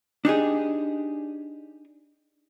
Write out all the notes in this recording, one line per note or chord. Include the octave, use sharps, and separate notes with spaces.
D4 D#4 G4 G#4